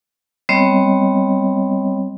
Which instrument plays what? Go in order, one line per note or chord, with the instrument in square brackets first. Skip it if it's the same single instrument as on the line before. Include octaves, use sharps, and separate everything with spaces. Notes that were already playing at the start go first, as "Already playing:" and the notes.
[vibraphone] G3 B3 C4 C#5 D#5